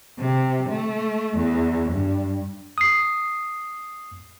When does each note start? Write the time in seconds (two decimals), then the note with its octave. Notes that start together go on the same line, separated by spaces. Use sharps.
0.19 C3
0.69 A3
1.37 E2
1.92 G2
2.78 D#6 C7